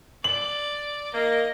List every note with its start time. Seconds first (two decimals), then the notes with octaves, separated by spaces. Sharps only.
0.24 D5 F#7
1.13 A#3 D#4 D#5